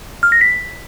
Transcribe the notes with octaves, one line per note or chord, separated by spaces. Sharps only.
F6
A#6
B6